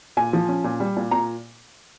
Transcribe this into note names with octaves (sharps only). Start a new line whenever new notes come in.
A#2 G#5
F3
C#4
A#2
G3
A#2
A#2 A#5